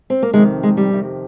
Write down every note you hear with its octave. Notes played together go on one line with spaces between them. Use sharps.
C4
A#3
F2 C3 D#3 G#3
G#3
G3
F2 C3 D#3